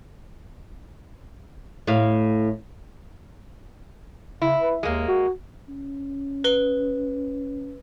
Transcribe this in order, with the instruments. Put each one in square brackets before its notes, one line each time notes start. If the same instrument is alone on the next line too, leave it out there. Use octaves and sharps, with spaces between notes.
[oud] A2 F5
[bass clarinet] C#3 [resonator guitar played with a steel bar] E4
[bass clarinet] B4
[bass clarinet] D#2 [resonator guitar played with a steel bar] G#3 A#3
[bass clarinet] F#4
[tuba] C#4
[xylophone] B4 G7